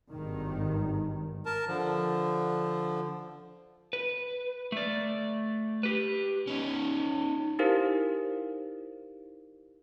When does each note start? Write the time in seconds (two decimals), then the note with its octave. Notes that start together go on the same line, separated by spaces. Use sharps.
0.11 G#1 G2 D#3
1.46 A#4 A5
1.67 D3 F3
3.93 B4
4.72 A3 D5
5.83 G4 B4
6.47 C#4 D#4
7.59 D#4 E4 G4 A#4 C5 F5